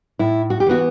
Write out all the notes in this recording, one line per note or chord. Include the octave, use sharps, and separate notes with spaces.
A2 E4
F#4
G4
E3 B3 F#4